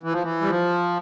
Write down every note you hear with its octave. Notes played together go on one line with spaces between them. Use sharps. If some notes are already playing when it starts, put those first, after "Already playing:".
E3
F3
E3
G3
F3